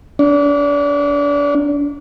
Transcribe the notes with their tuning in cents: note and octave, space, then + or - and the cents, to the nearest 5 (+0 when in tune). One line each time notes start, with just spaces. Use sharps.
D4 -30